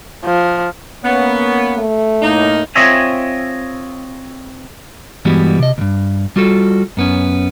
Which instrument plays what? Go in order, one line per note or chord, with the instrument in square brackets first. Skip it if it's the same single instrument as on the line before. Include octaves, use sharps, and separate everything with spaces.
[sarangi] F3
[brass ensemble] A#3 C#4 C#5 [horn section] B3
[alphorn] A3
[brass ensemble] A2 A#3 [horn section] D#4
[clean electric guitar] C4 F4 C#5 D#5 E5 G#5
G2 E3 G3 G#3 B3 F#4
C3 D#5
C#2 G2
G3 F4 F#4 A4
F#2 B3 C#4